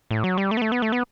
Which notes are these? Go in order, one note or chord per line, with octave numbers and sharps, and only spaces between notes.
A2
F#3
G3
A3
B3
A3
B3
A3
B3